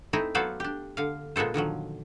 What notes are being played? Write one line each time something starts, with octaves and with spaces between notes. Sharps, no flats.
A3 C4 D#4 E4
F#3 B3 A4 C5 D5 F5
D4 G4
D3 F5
A#2 G#3 B3 A4 C5
D3 D#3 F3 F#3